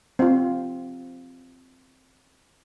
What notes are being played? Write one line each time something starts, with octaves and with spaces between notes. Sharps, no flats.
C4 F4